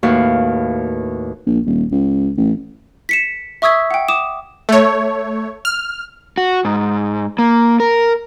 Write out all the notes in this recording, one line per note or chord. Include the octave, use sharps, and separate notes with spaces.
D#2 A2 F#4 B4 F5
A#1
D#1
C#2
A1
B6 C#7 E7
E5 C#6 D#6 E6 G#6 B6
F#5 G5
D6 D#6 E7
A3 C#5
F6
F#4
G#2
A#3
A#4